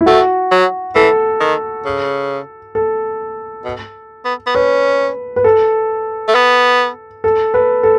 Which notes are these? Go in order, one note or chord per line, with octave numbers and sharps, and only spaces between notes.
E4
A3 F#4
F#3
E3 A4
D#3
C#3
A4
B2
B3
B3
C#4 B4
B4
A4
A3
B3
A4
B4
A4